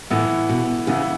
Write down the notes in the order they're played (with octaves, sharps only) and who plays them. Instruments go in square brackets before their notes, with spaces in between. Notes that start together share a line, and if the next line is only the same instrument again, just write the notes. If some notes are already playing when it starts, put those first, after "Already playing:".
[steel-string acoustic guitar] A2 [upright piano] E3 B3 E4
[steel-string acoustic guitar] B2
[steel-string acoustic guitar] C#3 [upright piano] E3 B3 E4